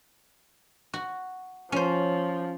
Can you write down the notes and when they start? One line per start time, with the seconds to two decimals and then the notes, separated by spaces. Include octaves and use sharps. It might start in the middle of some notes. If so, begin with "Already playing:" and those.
0.94 F#4
1.72 F3 C#4 C5